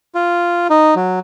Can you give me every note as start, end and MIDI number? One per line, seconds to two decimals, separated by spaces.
0.15 0.67 65
0.70 0.95 63
0.96 1.19 54